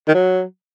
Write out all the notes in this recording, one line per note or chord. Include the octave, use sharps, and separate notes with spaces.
D#3
F#3